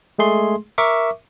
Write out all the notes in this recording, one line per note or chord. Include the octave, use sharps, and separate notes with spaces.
G#3 A3 G#4 C6
A#4 E5 C#6 D6